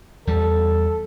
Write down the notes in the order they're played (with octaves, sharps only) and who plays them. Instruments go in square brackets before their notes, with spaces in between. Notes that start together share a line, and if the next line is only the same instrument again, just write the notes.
[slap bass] E2 G3 [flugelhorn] A4